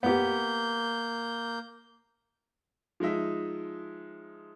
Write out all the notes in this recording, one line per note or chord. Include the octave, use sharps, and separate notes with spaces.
A#3 B3 G4 G6
F3 G#3 D#4 E5